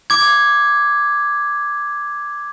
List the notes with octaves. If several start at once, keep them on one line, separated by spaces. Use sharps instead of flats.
D6 G#6